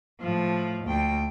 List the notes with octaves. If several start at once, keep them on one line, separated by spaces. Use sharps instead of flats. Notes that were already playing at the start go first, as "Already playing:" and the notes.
A2 F3
D2 G5